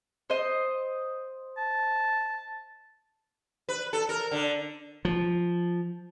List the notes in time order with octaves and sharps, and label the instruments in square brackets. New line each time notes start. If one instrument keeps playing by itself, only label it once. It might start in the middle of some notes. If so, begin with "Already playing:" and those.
[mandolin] C5 D#5
[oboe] A5
[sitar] B4
A4
A#4
D3
[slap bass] F3